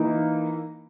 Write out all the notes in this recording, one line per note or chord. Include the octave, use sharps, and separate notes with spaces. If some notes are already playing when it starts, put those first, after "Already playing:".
Already playing: E3 A#3 D#4